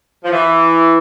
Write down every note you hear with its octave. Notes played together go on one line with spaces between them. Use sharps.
F3
E3